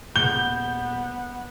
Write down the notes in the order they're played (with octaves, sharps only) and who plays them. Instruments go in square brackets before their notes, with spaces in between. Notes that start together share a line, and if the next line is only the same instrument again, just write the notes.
[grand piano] D#1 G#4 [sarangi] B3 [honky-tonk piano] G6 [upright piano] G7